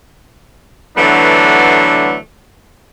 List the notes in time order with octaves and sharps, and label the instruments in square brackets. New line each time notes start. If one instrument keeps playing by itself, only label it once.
[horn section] D3 E3 F#3 A3 B3 D4